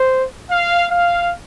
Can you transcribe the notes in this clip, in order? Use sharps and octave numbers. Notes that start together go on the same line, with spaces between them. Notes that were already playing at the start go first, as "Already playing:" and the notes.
Already playing: C5
F5
F5